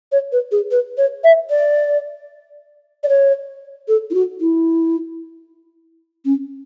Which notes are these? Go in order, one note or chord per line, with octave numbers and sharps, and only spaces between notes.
C#5
B4
G#4
B4
C#5
E5
D5
D5
C#5
A4
E4
F#4
E4
C#4